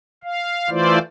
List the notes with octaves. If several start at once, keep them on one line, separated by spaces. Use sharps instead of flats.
F5
E3 A3 E4 F4 C5 D5